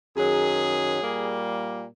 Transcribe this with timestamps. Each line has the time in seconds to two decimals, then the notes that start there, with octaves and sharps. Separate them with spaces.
0.16 F#2 D#3 F#3 G#4
1.01 A#2 G3 A#3